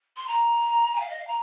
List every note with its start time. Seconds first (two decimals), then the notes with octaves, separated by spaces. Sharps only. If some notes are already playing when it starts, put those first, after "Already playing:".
0.17 C6
0.28 A#5
0.95 G#5
1.00 F5
1.10 D#5
1.18 F5
1.27 A#5